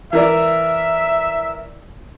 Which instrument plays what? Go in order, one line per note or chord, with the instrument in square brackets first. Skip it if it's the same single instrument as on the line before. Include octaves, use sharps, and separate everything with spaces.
[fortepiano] E3 A#4 D5 [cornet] E5